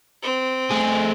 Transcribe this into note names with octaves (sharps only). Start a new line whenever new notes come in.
C4
A3 G#4